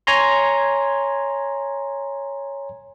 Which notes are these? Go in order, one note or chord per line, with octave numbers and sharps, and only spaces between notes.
C#5 G#5 A#5 C6